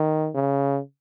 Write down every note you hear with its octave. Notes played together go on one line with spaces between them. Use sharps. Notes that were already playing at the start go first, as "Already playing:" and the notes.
Already playing: D#3
C#3